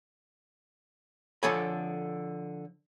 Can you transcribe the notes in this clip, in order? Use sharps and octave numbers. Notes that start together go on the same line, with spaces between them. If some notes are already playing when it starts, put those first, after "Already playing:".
D3 F3 A4 C#5 G#5 B5